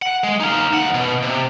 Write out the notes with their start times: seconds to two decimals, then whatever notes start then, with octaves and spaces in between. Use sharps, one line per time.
0.02 F#5
0.24 G#3
0.40 D#4 F5
0.73 D#2 F#5
0.94 B2
1.23 C3